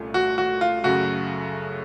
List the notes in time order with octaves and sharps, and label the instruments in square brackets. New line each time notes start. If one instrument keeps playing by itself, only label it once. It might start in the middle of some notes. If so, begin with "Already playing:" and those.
Already playing: [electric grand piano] C2 A#2 A3 C#4 F4
[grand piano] F#4
F#4
F4
[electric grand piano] F#2 C#3 A3 [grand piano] F#4